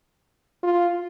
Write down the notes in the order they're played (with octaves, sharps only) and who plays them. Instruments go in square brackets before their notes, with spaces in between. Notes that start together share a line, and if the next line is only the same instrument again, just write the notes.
[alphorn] F4